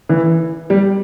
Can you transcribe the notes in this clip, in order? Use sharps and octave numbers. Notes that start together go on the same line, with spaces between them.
E3
G3